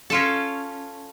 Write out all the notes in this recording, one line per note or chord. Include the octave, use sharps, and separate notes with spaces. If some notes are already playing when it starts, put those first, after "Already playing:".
C#4 F4 A4